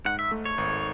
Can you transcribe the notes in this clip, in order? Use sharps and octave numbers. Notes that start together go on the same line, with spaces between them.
G#2 F#5
E5
A3
C#5
G#1